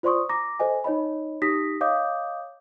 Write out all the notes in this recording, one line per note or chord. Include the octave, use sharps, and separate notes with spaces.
F4 C5 D5 C6 C#6 D#6
A#5 D6 A#6
A4 C5 D#5 G#5
D#4 C#5 D#5 B5
D#4 G4 D#6 A#6 B6
C#5 D#5 F5 D6 D#6 G6